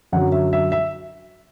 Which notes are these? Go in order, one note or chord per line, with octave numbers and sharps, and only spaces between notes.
F#2 D3 F#3 F#5
E5
E5
E5